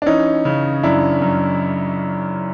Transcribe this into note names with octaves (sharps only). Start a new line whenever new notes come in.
D4
E3 C#4 D#4
C#3
F#2 D4 E4
F#2